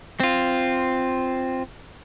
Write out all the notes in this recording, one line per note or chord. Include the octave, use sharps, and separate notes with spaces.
C4 F4